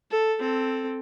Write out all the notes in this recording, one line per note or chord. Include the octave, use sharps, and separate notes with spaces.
A4
C4 A4